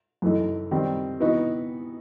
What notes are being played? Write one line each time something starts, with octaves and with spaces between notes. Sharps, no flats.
F#2 E3 A3 D#4
D#3 G3 C4
E3 B3 D#4 F#4